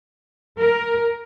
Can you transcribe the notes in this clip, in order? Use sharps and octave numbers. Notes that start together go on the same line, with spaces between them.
A#4